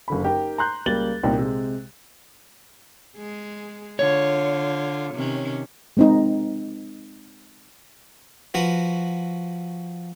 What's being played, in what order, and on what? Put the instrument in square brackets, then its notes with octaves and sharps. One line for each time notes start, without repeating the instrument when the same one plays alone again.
[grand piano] F#1 D3 B5
D#4 G4 A#4
A#5 C6 F#6 G6
C#2 G3 A#3 A6 F#7 G7
C2 A#2 D#4 G4 A#4 G5
C3 G#3
[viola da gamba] G#3 G#4
[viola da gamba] D3 F4 [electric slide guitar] C#5
[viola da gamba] C3 D#3 C#4
[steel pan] G#3 C4 D#4
[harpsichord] F3 F#4 B4